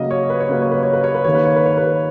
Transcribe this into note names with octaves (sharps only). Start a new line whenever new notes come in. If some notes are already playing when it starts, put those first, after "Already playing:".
Already playing: C#3 F#3 A#3 D#5
C#5
B4
C#5
C#3 F#3 A#3 B4
C#5
B4
C#5
B4
C#5
B4
D#3 A#3 C#5
B4
C#5
B4
C#5
B4